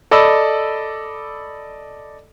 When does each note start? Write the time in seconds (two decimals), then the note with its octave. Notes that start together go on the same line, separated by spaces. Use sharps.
0.11 A4 D5 D#5 B5 E6